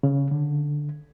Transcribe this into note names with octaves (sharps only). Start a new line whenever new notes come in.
C#3
D3